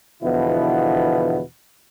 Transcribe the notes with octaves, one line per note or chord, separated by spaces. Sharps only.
E2 B2 D3 F3 B3 E4